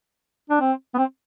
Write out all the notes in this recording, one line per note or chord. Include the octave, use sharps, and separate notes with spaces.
D4
C4
B3
C4